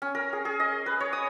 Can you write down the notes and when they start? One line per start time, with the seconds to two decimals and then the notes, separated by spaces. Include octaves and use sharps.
0.02 C#4
0.15 A#4
0.33 G#4
0.45 G#4
0.60 D#5
0.86 B4
1.00 C#5
1.13 D#6